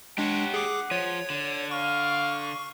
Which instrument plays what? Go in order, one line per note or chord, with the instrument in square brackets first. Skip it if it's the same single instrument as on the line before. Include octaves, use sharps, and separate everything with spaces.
[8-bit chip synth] G#3 D4 [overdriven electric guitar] G4 C#5 [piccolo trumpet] F#5
[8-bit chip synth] G#4 D6
[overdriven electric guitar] F3 [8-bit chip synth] C#5
[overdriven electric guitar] D3
[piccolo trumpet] F5 [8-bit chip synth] C#6